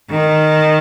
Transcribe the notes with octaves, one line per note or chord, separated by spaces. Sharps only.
D#3